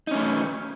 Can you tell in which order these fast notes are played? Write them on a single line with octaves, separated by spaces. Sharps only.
D#4 C#4 A3